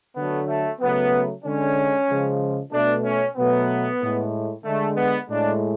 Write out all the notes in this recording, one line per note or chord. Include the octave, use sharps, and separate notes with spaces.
D3 F#3 A3 B3
A3
C#3 F#3 A3 B3
D3 G#3 C#4
C#3 F3 G#3
B2 A3 D4
C#4
B2 F#3 A3 B3
A2 G#3
D3 G#3 A3
B3
A2 G#3 D4